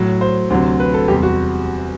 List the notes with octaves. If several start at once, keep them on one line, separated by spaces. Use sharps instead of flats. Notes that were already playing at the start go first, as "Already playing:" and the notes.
Already playing: A2 F#3
C5
D2 C3 F#3
B4
A4
E2 C3 G3 G4
F#4